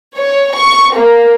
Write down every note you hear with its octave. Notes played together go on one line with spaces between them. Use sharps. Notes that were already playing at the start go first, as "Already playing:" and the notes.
C#5
C#6
A#3